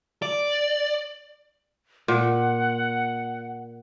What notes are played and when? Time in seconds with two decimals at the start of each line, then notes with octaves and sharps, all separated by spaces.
0.22 D5
2.08 A#2 F#5